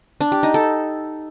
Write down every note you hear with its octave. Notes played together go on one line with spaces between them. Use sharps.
D4
G4
D#4
A4